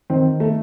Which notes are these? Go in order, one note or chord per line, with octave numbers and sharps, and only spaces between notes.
D#3 C4
A3